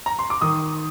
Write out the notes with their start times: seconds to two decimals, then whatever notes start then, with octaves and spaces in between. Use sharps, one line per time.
0.06 A#5
0.19 C6
0.30 D6
0.41 D#3 D#6